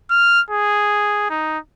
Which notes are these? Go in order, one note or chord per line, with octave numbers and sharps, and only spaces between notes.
F6
G#4
D#4